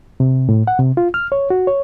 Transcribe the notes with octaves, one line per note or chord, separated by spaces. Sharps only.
C3
A2
F#5
C3
F4
F6
C#5
F#4
C#5